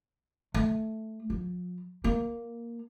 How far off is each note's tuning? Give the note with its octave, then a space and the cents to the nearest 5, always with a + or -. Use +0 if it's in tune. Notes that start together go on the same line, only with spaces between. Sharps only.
A3 +0
F3 +40
A#3 +5